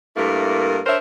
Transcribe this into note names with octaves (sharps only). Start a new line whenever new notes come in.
G2 A3 A#3 E4 A#4
D4 A#4 C5 C#5 E5